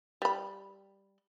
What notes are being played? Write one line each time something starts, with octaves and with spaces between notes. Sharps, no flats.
G3 B5